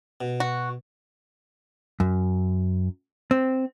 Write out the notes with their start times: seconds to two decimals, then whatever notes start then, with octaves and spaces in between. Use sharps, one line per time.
0.21 B2
0.40 F#4
2.00 F#2
3.31 C4